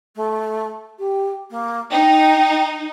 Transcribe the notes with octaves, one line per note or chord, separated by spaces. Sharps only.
A3
G4
A#3
D#4 G5